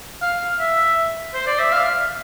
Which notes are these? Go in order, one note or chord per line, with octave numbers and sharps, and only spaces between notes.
F5
E5
C5
D5
E5
F5